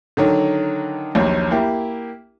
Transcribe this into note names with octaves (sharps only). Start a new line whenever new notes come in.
D3 D#3 F#3
A#1 D#2 F#3
A#3 E4 G4